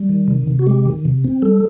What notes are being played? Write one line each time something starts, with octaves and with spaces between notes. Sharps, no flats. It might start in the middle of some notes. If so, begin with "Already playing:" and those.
Already playing: G3
D#3
C3
C3
F#4
G#3 G4
D#3
C3
C4
G3 A4